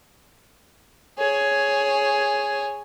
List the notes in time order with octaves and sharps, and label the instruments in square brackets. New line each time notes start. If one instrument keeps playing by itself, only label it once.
[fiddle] G#4 C#5